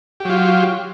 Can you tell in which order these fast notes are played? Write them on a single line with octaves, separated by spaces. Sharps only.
G4 F#3 F4